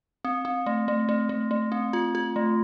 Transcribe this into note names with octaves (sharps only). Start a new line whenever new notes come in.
C4
C4
A3
A3
A3
A3
A3
C4
F4
F4
A3